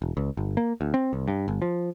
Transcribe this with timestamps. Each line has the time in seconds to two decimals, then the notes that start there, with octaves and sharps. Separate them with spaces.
0.02 E1
0.17 C#2
0.37 G1
0.57 A#3
0.81 D2
0.94 C4
1.13 C2
1.28 G2
1.48 G1
1.62 F3